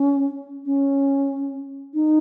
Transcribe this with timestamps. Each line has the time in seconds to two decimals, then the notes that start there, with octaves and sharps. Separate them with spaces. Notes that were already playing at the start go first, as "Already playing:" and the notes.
Already playing: C#4
0.65 C#4
1.94 D#4